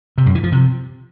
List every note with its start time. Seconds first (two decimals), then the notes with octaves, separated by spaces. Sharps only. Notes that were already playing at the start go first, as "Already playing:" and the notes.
0.18 C3
0.26 F#2
0.35 E3
0.43 F3
0.52 C3